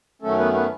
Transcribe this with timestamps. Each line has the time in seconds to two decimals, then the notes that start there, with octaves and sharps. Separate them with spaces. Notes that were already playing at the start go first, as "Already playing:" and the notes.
0.22 F#2 D#3 F#3 A3 C#4 A4
0.37 B3 B4
0.54 B3 B4